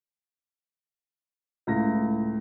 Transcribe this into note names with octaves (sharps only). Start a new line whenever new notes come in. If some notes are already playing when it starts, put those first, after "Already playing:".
C#2 A2 A#6